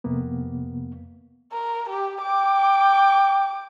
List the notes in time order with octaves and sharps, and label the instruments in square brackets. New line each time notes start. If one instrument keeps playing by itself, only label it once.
[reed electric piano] F2 C3 A#3 B3
[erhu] A#4
G4
[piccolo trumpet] G5 [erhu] D6